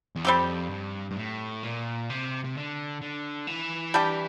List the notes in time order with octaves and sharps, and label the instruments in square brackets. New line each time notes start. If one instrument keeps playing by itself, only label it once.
[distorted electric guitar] E2
[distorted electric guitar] F2 [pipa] G3 C4 G4
[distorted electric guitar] G2
G2
A2
A#2
C3
C3
D3
D3
E3
[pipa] G3 D4 G4